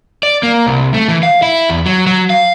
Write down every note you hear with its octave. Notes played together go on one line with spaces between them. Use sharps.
D5
A#3
C2
A3
E3
F5
E4
E2
F#3
F#3
F5